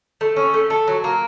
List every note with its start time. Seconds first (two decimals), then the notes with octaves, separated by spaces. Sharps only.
0.21 A3
0.36 C#4
0.54 A3
0.70 A3
0.88 F#3
1.04 A#3